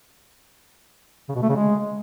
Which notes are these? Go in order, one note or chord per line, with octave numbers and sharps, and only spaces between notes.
C#3
B2
A3
C#3
G#3